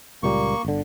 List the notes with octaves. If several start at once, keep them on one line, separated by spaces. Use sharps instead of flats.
C#2 A#2 G3 A#3 C#6
G1 D3